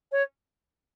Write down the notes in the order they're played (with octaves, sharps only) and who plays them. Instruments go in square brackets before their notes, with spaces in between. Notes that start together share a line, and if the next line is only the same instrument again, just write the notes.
[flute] C#5